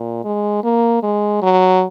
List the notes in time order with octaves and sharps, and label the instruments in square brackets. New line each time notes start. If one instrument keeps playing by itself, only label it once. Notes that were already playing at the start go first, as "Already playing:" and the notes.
Already playing: [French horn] A#2
G#3
A#3
G#3
F#3